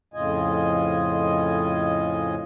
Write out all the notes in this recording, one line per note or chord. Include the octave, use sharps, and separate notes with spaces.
F2 A2 C#3 F4 D#5 G#5